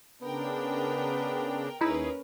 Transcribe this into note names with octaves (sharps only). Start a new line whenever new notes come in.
C#3 B3 D4 A#4 G5
D#2 C#4 D#4 E4 G#4 A#4 B4